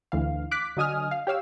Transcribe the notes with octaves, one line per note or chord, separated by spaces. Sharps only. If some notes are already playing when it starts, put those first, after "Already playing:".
D2 E3 F5
D6 F#6 B6
D3 F#3 D#5 G#5 D#6 F6
F5
G4 C#5 F5 E6